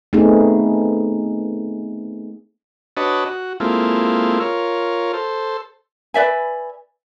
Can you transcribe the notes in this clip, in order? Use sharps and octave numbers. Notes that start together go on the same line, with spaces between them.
A3 B3 C4 D#4 G#4
D4 F#4 B4 C#5 D#5 A5
F#4
G#3 A#3 C4 E4 F4 A4
F4 A#4 C#5
A4 C5
B4 D5 E5 G#5